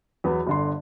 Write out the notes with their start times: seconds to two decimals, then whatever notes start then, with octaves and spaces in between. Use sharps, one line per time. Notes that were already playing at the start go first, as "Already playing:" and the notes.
0.24 E2 F#3 B3
0.47 G1 D3 C6